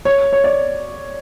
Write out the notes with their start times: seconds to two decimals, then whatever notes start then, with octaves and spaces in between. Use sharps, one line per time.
0.05 C#5
0.33 C#5
0.44 D5